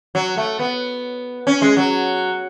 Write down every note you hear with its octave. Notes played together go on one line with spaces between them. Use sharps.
F#3
A3
B3
C#4
G#3
F#3